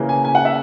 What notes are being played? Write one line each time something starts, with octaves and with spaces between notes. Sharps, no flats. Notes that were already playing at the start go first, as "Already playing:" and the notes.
Already playing: C#3 E3 A#3 C#4
G#5
G#5
F#5
E5